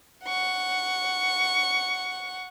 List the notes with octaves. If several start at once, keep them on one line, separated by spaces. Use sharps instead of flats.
F#5 C#6